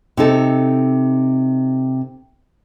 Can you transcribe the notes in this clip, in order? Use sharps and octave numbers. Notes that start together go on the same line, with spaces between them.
C3 D#4 A4